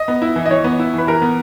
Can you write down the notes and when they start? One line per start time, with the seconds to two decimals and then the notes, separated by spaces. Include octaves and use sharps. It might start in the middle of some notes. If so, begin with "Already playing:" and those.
Already playing: D#5
0.08 B3
0.22 E4
0.36 E3
0.46 D#5
0.51 E3 C#5
0.64 B3
0.79 E4
0.94 E3
0.98 B4
1.07 E3 A#4
1.22 B3